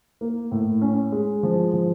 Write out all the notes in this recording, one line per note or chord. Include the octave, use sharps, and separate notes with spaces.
A#3
A2
C#4
G#3
F3
F3